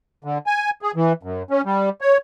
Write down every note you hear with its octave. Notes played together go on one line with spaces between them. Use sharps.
D3
G#5
G#4
E3
F#2
C#4
G3
C#5